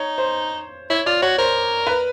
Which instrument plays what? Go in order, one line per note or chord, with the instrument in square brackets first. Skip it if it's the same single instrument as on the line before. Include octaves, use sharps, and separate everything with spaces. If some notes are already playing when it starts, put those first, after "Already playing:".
Already playing: [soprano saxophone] D#4 [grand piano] C#5
[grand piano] C5
[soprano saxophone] E4 [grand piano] C#5
[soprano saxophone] F4 [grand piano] D5
[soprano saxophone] F#4 [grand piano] C#5
[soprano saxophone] A#4 [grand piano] C5
[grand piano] B4